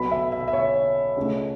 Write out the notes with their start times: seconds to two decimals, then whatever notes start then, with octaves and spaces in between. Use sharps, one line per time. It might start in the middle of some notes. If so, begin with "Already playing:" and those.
Already playing: B1 B2 F#3 B3 B5
0.11 E5
0.32 E5
0.48 E5
0.53 C#5
1.17 C#2 C#3 A3 C#4